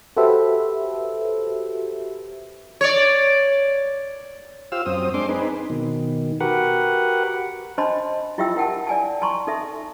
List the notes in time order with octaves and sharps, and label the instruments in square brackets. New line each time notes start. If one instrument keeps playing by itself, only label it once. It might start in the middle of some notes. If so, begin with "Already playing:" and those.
[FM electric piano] F#4 G4 A4 B4 C5 E5
[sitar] C#5 D5
[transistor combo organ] F4 G4 C5 F5 E6
F#2 C4 C5 D#6
G#3 C4 D4 C6 D6
C4 D#4 G#4 B4
[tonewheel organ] B2 D#3
F#4 G4 A#4 B4 F#5
[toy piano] D4 C5 D#5 A5 B5 C6
E4 F4 G4 E5 G5 E6
E4 A#4 F#5 G5 A5
D5 G#5 A5
A5 A#5 C6 C#6
D#4 A4 E5